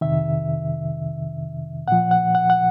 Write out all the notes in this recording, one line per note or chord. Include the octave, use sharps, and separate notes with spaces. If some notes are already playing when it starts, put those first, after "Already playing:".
F2 C3 D#3 E5
A#2 F3 F#5
F#5
F#5
F#5